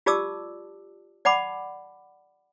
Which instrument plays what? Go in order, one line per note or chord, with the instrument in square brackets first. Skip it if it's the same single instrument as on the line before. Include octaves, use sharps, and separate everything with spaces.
[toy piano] F4 G4 D5 A5 D6 E6
D5 F#5 A5 B5 D6